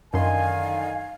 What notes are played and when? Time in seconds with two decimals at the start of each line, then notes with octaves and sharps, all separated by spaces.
0.14 F#2 D3 D#3 F5 G#5 C6